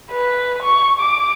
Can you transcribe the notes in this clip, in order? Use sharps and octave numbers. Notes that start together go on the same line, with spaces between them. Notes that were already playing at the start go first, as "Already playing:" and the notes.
B4
C#6
D6